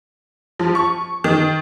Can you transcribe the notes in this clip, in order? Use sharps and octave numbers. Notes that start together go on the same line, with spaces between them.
F3
C#6
D#3